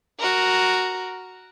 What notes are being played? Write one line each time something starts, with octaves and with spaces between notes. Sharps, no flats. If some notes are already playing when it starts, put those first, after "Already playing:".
F#4 A#4